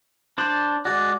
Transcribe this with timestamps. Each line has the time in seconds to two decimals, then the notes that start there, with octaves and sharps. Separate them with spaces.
0.38 D4 C5 D5
0.85 G#3 F#4 D5